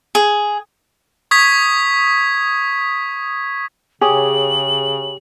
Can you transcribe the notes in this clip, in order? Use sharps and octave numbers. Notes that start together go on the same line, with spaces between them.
G#4
C#6 D#6 G#6 B6
C#3 G4 G#4 C#5 F#7